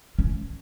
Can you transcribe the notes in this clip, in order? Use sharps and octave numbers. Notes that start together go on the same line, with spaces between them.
C#4